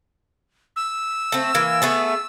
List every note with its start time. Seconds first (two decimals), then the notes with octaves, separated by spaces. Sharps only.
0.76 E6
1.32 A3 C4
1.54 E3 A#3
1.82 A3 B3 G#4